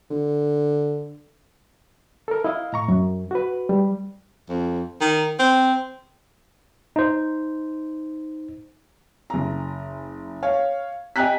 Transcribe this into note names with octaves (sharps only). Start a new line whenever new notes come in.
D3
A4 A#4
E4 D#5 F5
A2 A#5 C#6
F#2
F#4 B4
G3
F2
D#3
C4
D#4 C5
F#1 A#5
C#5 F5
D#5 G5 G#5 A#5 F#6 B6